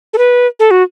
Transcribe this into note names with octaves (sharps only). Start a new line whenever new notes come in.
A4
B4
A4
F#4